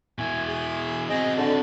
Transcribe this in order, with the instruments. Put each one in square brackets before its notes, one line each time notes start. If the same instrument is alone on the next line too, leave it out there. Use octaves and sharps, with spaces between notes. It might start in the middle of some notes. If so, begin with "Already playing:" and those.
[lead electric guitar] B2 E4 [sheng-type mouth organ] G#5
[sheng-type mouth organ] G#4
[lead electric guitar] C4 F#4 [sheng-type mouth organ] G#4 D#5
[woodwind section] D3 [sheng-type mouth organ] A5